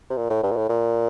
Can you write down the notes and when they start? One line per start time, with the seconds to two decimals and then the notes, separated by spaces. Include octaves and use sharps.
0.10 C3
0.17 A#2
0.30 A2
0.43 G2
0.51 A#2
0.57 A2
0.69 A#2